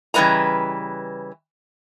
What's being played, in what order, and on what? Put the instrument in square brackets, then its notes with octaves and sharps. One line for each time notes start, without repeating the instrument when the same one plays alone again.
[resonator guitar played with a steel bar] C#3 E3 G3 B4 D#5 A#5